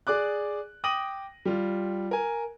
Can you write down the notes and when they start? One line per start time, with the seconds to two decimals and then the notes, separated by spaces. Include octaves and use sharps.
0.07 G#4 D5 D6 F#6
0.84 G5 D6 D#6 A#6 D#7 F#7
1.45 G3 F4
2.11 A#4 G#5